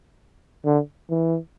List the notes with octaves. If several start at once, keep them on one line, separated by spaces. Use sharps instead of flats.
D3
E3